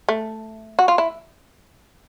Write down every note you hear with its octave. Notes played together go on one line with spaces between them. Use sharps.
A3
F#4
F4
E4